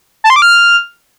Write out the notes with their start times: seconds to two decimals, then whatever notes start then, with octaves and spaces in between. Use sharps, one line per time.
0.24 A5
0.30 C6
0.36 D6
0.42 F6